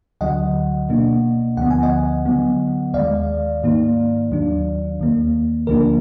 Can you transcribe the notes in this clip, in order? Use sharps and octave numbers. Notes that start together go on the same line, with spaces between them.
D2 D3 F#3 D#5 F#5
B2 A#3 D4
D2 D3 F3 B3 F#5
G#5
D#5 F#5
D3 F#3 B3
D#2 D#3 G#3 D5 F5
G#2 D#3 A#3 D#4
D#2 D#3 F#3 D4
D#2 D#3 A#3
D2 D3 F3 A#3 D4 A#4